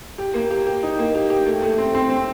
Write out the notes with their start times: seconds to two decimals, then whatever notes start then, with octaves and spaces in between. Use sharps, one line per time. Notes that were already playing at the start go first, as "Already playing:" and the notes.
0.18 G4
0.34 A#3
0.51 G4
0.67 G4
0.83 D#4
0.99 A#3
1.15 G4
1.30 G4
1.46 A3
1.62 A3
1.78 C4
1.95 C4
2.10 C4